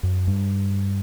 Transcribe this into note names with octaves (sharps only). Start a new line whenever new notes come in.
F#2
G2